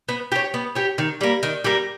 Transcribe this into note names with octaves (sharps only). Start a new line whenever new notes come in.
B3
G4 C#5
B3
G4 C#5
D#3
G3 A#3
D#3
G3 A#3